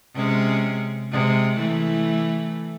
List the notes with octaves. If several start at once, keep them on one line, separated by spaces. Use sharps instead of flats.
C3 G#3 C#4
C3 G#3
E3 A3